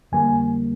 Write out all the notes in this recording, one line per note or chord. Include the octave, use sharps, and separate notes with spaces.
F2 D3 G3 A#3 G#5